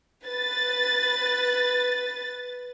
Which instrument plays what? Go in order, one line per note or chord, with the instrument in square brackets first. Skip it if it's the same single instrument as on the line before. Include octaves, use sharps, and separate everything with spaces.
[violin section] B4 A6